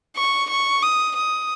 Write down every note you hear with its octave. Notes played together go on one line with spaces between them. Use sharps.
C#6
C#6
D#6
D#6